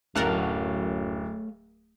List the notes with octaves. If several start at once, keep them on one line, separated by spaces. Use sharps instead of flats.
D1 F#2 A3 A#4 C#5 F5 F#5 A5